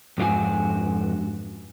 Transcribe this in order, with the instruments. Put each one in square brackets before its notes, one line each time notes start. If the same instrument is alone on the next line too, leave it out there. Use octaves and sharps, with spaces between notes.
[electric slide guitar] F2 G#2 D4 F4 F#4 G#5